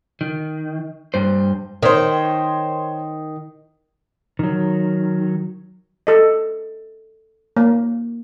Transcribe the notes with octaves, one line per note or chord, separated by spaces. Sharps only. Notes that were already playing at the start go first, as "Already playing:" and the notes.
D#3
G2 C5
D#3 C5 C#5
D#3 F#3
A4 D#5
A#3